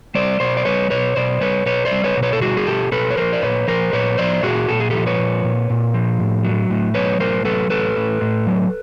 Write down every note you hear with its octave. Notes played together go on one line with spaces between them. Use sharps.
G3 C5 D5
B2 C5 D5
D5
G3 B4 C#5
B2 B4 C#5
B2 C5 D5
G3 B4 C#5
B2 B4 C#5
C5 D5
G3
B4 C#5
B2
B4 C#5
A4
G3 F#4 G#4
G#4
B2 G4 A4
B2 A4 B4
C#5
F3 A#4 C5
D5
A#2 B4 C#5
F3 A#4 C5
A#2 B4 C#5
F3 C5 D5
A#2 F#4 G#4
A#2 A4
G#4
F3 G4 A4
B4 C#5
A#2
A#2
A#2
F3
A2
F#3
A2
F#3 B4 C#5
A2 A#4 C5
F#3 A4 B4
A2 A4 B4
A2
A2
F#3